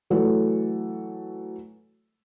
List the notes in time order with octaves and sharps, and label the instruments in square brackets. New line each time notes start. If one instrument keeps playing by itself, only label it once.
[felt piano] E3 F#3 A3 A4 C#5